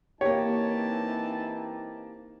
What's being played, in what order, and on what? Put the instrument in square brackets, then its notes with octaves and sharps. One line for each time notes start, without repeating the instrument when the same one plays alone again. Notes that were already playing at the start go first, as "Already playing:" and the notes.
[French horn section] E3 C4 D#4 [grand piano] A#3 G4 [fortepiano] C#5 [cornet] A5